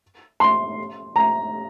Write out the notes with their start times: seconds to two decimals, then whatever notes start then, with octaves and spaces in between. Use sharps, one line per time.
0.40 C6
1.16 A#5